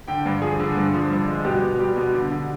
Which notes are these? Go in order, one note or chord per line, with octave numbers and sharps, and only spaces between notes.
D3 G5
G2
F3 G#4
D3
G2
F3
G2
G#3
B2 G4
B2
G3 G4
B2
D3
D3